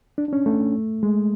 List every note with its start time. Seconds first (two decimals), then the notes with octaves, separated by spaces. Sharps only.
0.18 D4
0.28 D4
0.33 C#4
0.46 A3
1.03 G#3